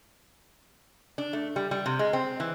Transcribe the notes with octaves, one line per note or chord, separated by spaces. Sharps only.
D4
A3
G3
G3
C3
G#3
C4
E3